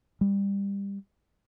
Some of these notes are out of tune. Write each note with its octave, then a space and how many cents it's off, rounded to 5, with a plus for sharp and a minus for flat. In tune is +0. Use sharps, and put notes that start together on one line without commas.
G3 +20